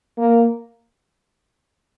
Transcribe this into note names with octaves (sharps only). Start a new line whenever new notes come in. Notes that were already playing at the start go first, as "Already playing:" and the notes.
A#3